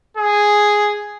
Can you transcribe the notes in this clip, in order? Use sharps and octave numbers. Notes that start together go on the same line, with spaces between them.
G#4